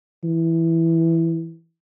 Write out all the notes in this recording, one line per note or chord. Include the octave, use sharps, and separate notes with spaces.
E3